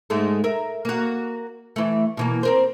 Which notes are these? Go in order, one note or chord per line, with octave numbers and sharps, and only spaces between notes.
G#2 G#3 A3
A#4 E5
A#3 F#4
E3 A3
B2 E3 A#3
C4 A#4 C5